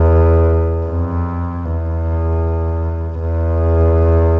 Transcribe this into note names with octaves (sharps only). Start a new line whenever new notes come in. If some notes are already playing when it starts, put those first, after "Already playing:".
Already playing: E2
F2
E2
E2